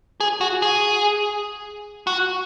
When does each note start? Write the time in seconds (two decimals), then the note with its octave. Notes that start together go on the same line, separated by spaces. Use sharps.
0.20 G#4
0.41 F#4
0.62 G#4
2.07 F#4